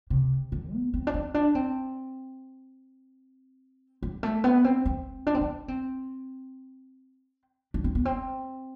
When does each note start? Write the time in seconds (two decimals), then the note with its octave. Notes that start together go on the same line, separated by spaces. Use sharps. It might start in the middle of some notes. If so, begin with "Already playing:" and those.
0.10 C3
0.52 D3
0.73 B3
0.94 C4
1.07 D4
1.14 C4
1.34 D4
1.55 C4
4.03 G3
4.23 A3
4.44 B3
4.64 C4
4.86 C4
5.27 D4
5.35 C4
5.41 D4
5.68 C4
7.74 D4
7.84 C4
7.95 B3
8.05 C4